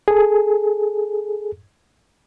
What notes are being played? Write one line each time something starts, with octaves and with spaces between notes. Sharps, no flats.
G#4 A4